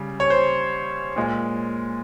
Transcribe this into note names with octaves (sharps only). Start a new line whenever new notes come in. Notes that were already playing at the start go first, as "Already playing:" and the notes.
Already playing: C#3 G3
C#5
C5
A#2 G#3